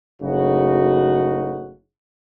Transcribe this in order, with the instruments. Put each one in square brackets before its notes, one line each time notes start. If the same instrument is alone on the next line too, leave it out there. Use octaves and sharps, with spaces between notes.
[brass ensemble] F#1 A2 C#3 D#4 F#4